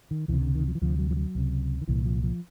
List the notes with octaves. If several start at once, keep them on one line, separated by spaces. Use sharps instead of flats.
D#3
C#2 C3 E3
D3
D#3
F3
E3
D2 C3 F3
F#3
F3
F#3
C#2 C3
D#3
C2 A#2 E3
F3
F3